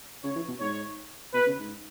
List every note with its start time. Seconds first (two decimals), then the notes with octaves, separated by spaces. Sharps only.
0.24 C#3 C#5
0.36 E3
0.48 B2
0.60 G#2 C#5
1.33 B2 B4
1.46 C#3
1.59 G#2